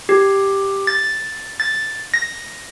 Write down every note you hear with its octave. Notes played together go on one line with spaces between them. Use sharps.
G4
A6
A6
A#6